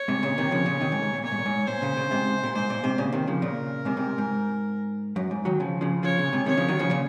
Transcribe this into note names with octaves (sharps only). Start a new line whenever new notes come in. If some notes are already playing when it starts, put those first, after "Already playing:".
Already playing: C#5
G#2 C3
A#2 C#3
C3 D#3
C#3 F3
A#2 C#3
C3 D#3
G#2
G#2
A#2
A#2 C#5
G#2
A#2
G#2
A#2 C5
A#2 C#3
A#2 C#3
G#2 C3
A#2
G#2 C5
A#2
G#2 C3
A#2 C#3
C3 D#3
C#3 F3
A#2 C#3 A#4
G#2 C3
G#2 C3
G#2
F#2
G#2
D#3 F#3
C#3 F3
C#3 F3
C#3 F3 C#5
A#2 C#3
G#2 C3
C3 D#3 C#5
C#3 F3
D#3 F#3
C#3 F3
A#2 C#3